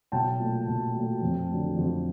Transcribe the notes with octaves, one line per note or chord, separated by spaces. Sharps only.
B1 G5 A5
A#2 F#3 A3
B1
A#2 F#3 A3
F2
D3 F#3 A3
F2